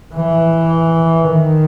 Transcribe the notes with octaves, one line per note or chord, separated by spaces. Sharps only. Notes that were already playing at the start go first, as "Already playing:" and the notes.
E3
D#3